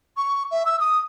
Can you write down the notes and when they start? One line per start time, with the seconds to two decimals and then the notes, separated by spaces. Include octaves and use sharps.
0.16 C#6
0.50 E5
0.65 E6
0.80 D#6